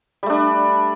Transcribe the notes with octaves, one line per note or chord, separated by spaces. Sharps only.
G3 A3 D4